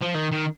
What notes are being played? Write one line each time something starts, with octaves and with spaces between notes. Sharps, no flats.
F3
D#3
D#3